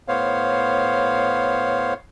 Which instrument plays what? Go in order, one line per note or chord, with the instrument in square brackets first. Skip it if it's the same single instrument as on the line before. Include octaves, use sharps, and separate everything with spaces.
[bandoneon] A2 B3 C5 C#5 F5